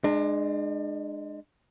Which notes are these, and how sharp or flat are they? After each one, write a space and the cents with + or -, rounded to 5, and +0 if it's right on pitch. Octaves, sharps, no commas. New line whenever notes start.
G#3 +0 D4 +35